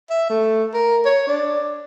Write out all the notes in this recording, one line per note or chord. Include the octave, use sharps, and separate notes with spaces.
E5
A3
A#4
C#5
D4